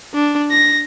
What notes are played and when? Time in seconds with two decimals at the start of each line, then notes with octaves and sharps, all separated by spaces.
0.14 D4
0.51 A#6